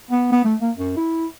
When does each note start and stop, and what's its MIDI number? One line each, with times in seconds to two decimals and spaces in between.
0.11 0.28 59
0.32 0.43 59
0.45 0.55 57
0.61 0.71 58
0.77 0.93 42
0.97 1.26 64